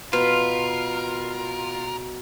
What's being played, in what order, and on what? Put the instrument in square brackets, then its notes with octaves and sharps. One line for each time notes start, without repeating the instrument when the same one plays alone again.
[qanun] B2 [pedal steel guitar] F4 [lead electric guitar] A#4 [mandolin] B4